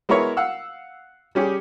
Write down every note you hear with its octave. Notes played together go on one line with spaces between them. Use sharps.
G#3 B3 E4 A#4 C#5
F5 F#5 E6
G3 C#4 G4 G#4